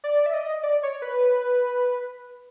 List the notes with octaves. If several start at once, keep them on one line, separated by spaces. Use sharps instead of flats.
D5
E5
D#5
D5
C#5
B4